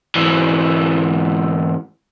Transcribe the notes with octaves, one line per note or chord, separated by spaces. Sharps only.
G#2 E3